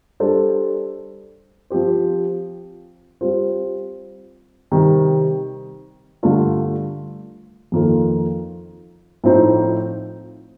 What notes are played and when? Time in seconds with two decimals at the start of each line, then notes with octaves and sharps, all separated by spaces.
0.20 G3 D4 A4 C5
1.70 F3 C4 G4 C5
3.21 G3 C4 F4 C5
4.72 C3 D#3 G3
6.23 G2 D3 A3 D4 F4
7.72 F2 D#3 A#3 F4 A4
9.24 A2 F3 A3 C4 D#4